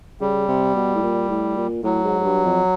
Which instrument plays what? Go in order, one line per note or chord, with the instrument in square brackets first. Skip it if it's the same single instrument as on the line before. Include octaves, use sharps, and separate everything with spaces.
[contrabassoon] C#3 [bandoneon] G3
[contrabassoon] C3
B2
A2
A#2
A2
A#2
[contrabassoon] A2 [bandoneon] F#3
[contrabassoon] G#2
G#2
G2
F2